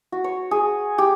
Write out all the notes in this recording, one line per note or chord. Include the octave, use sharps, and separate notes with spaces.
F#4
C#5
G#4
G4